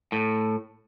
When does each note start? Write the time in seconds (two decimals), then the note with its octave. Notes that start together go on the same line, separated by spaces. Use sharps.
0.12 A2